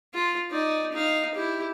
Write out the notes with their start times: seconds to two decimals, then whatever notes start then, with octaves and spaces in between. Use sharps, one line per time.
0.14 F4
0.51 D#4 D5
0.92 D#4 F5
1.34 E4 G4